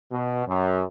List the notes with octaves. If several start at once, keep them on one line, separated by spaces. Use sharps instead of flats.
B2
F#2